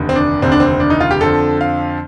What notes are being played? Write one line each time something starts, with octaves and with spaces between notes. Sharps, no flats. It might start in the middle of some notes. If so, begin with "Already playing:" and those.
Already playing: F1 D#2 D3
C4
D4
F1 D#2 D3 C4
D4
C4
D4
D#4
F4
G4
F2 D3 F3 A4
F5